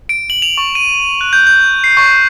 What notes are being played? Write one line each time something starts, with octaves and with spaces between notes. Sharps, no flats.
D7
F#7
F7
C#6
D#7
F#6
G6
G6
C7
C#6